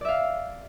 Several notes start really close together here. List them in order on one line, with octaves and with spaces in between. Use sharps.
D5 E5 F5